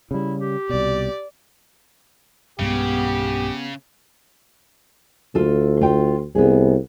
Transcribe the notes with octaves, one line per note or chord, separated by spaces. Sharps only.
C#3 G3 E4
G4
C2 B2 D5
B1 G2 C#3 G#3 B3 G4
D2 F4 A4
F4 G5
C2 B3 G#4